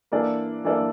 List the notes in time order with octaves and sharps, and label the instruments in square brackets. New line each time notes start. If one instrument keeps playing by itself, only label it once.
[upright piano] E3 A#3 D4 A4 D5
E3 A#3 D4 A4 D5